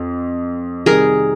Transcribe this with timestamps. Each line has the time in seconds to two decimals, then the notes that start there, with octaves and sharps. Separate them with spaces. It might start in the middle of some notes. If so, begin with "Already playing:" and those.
Already playing: F2
0.86 C3 D#3 G3 G#4 A#4